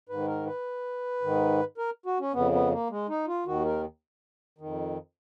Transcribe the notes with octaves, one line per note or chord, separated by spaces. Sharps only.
G#2 D#3 B4
A#4
B4
G#2 D#3
A#4
F#4
C#4
F2 C#3 B3
B3
A#3
G#3
D#4
F4
D#2 D#3 F#4
A#4
F2 D#3